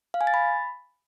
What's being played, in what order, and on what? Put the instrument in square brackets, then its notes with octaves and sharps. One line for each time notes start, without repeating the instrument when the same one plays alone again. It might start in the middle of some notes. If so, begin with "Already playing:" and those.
[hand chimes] F5
G#5
A6
B5